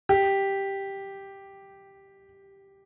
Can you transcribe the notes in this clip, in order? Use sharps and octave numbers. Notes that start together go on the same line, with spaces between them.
G4